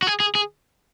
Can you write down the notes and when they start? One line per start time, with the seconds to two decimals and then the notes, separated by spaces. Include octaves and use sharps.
0.02 F#4
0.07 G#4
0.20 G#4
0.35 G#4